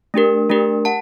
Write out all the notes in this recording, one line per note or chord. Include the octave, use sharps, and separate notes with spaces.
A3 D4 G4 A#4
A3 D4 G4 A#4
F#5 A5